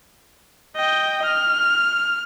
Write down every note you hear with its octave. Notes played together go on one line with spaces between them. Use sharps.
D#5 G5
F6